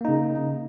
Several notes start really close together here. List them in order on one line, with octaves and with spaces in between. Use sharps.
A#3 D#4 C#3